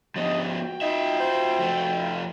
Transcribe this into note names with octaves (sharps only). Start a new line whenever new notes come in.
F3 B3 D4 G4 D#5
F#4 G5
D#4 F4 E5
C5
F2 A3
F4